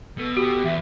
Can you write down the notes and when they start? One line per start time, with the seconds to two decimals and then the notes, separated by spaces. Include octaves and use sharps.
0.18 B2 A4
0.37 F#4 G4
0.64 E2 E5